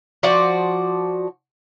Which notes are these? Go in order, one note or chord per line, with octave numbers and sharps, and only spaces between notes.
F3 F#4 D5